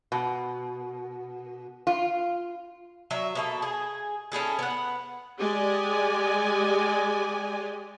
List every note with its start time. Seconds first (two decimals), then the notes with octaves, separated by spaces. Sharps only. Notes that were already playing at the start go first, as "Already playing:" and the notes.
0.12 B2
1.87 F4
3.11 F#3 E5
3.35 B2 A#3 A4
3.62 G#4
4.32 C#4 E4 G#4 A4
4.59 B3 F#5
5.37 G#3 G4 D5 D#5 G#5